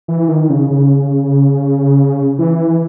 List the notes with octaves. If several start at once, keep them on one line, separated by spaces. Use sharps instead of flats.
E3
D#3
C#3
C#3
E3